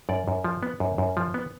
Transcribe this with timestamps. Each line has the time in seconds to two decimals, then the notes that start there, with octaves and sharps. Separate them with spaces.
0.09 F#2 D5
0.28 F#2
0.44 F3
0.63 B3
0.80 F#2
0.98 F#2
1.17 F3
1.34 B3